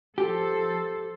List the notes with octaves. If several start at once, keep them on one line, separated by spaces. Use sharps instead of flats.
F3 G4 A4 C5